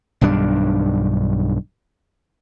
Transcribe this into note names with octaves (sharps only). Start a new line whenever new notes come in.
B1 G2 D#3 D4